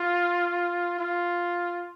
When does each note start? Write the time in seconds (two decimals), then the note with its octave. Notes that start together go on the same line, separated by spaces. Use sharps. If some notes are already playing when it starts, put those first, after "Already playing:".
Already playing: F4
0.99 F4